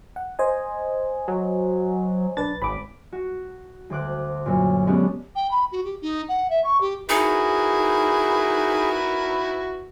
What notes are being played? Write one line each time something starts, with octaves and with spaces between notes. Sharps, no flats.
F#5
C5 D#5 G#5
F#3
B1 D4 B4 A6
G#1 B5 D6
F#4
D2 C5 D6 F#6
F#2 A#2
G#3 B3 C#4 D4 G4
G5
B5
F#4
G4
D#4
F#5
E5
C#6
G4
D#4 E4 F#4 G#4 A#4 B4